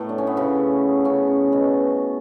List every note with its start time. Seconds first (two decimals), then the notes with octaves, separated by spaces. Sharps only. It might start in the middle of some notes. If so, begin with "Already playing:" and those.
Already playing: A2 A3 B3
0.09 D4
0.18 C#4
0.27 B3
0.37 C#3 C#4
1.05 C#3 C#4
1.52 B2 B3